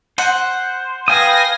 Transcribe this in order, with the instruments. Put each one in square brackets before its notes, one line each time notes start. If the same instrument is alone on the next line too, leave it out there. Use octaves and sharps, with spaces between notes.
[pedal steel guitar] C5 [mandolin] F#5
[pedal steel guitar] B4 G5 D#6 [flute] F5 [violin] G#5 A#6